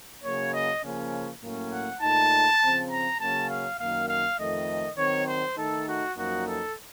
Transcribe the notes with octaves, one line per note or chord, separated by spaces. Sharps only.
C#3 F#3 A#3 C#5
D#5
C#3 F3 A#3 C#4
A2 F#3 A#3 C#4
F#5
A#2 A3 D#4 A5
C#3 F3 C4
A#5
C#3 F#3 A#3 C#4 A5
F5
F#2 D#3 A#3 F5
F5
F2 D#3 A3 D#5
D#3 F#3 C4 C#5
C5
D#3 A3 D#4 A4
F#4
F#2 F3 A#3 D#4 F#4
A4